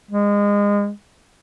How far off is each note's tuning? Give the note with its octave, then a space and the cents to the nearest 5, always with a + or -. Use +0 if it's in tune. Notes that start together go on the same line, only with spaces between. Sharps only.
G#3 -25